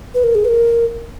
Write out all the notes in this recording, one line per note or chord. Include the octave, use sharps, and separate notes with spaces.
B4
A#4
G#4
B4
A#4